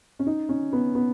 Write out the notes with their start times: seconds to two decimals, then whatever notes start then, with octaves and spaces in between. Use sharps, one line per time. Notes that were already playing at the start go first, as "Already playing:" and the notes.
0.19 C#4
0.26 D#4
0.49 C#4
0.73 B3
0.95 B3